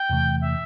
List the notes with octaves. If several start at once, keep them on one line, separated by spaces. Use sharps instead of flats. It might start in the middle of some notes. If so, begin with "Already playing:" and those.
Already playing: G5
E2 C3 E3 A3
E5